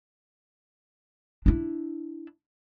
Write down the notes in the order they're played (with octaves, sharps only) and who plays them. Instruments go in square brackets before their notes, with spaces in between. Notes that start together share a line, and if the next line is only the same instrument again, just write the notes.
[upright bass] D4 E4